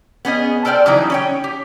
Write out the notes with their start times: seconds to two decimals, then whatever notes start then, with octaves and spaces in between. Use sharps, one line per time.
0.25 B3 C#4 G#4 D#5
0.65 A4 A#4 C5 D5 G5
0.86 C#3 E3 F#3 G3 D#4 E4
1.10 C#4 C#5 G5
1.44 G4